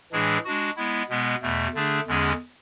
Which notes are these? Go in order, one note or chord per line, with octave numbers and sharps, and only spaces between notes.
A2 E3 G#3 D4 G#4
G#3 D4 F#4
G#3 B3 E4
B2 G#3 B3
E2 B2 A3
D3 A3 D4 G#4
E2 D3 G#3 C#4 G#4